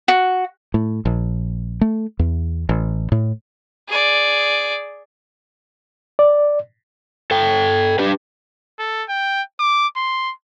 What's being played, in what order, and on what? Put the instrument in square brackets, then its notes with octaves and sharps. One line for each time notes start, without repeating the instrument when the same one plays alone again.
[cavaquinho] F#4
[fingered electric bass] A2
A#1
A3
E2
A1
A2
[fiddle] G#4 D5
[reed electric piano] D5
[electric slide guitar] A4 G5
D4 G4 B4
[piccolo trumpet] A4
G5
D6
C6